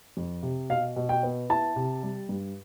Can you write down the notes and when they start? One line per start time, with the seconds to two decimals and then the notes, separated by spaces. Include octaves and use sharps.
0.17 F2
0.43 C3
0.70 B2 F5
0.96 B2
1.09 G5
1.23 B3
1.50 E4 A5
1.76 C3
2.03 G3
2.29 G2